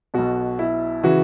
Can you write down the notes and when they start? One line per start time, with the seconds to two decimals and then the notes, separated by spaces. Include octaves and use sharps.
0.14 B1 B2 F#4
0.59 E4
1.03 C#3 E3 F#4